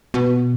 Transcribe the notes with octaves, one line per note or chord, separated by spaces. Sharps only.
B2